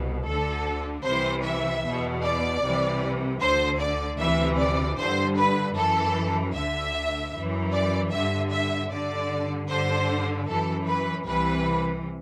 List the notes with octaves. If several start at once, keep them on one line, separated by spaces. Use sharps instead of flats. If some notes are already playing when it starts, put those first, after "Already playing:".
Already playing: C2 B2
D2 D3 A4
C2 C3 E3 C5
E5
E2 B2
D5
C2 C3 E3
D2 D3 C5
D5
D2 C3 E3 E5
D5
G2 D3 C5
B4
F#2 E3 A4
D2 D3 E5
F#2 E3
D5
G2 D3 E5
E5
G2 D3 D5
G2 D3 C5
F#2 E3 A4
B4
C2 C3 E3 B4